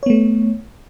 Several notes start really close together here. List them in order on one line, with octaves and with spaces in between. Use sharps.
C#5 B3 A3